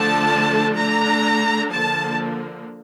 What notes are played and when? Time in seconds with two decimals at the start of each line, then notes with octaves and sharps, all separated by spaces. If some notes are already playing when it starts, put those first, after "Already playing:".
Already playing: D3 F3 A3 D4 A5
0.76 D3 A3 D4 A#5
1.71 D3 F3 A#3 A5